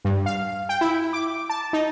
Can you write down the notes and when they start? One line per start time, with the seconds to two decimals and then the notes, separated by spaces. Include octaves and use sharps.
0.05 G2
0.26 F5
0.69 G5
0.81 E4
1.13 D6
1.50 A5
1.73 D#4